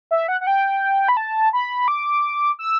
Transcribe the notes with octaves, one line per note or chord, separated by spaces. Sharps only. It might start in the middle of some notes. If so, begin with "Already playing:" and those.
E5
F#5
F#5
G5
B5
A5
B5
D6
E6